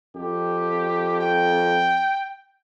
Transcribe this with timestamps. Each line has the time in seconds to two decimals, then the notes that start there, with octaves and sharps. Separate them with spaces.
0.16 F2 G4
1.21 G5